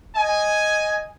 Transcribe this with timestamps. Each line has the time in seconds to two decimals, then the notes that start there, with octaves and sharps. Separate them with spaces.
0.16 D#5 G#5